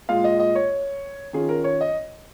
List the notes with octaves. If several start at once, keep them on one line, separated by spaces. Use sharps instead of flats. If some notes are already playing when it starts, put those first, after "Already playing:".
A#2 G#3 F4 F5
D#5
D#5
C#5
D#3 C#4 F4 G#4
A#4
C#5
D#5